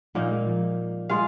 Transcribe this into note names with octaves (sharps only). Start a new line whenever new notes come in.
A#2 F3 A#3 D#4
G#3
F3
G#3 F4 G#4 F5